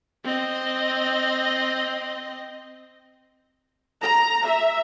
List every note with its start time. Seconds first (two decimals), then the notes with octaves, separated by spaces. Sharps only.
0.24 C4 D#5
4.01 A#5
4.46 E5